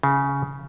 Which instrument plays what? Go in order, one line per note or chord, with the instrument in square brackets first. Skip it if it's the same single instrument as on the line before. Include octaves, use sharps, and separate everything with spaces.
[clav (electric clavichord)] C#3